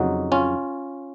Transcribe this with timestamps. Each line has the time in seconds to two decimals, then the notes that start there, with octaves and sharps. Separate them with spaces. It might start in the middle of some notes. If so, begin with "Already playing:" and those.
Already playing: F2 C#3 F#3 D#4 F#4
0.32 C#4 F4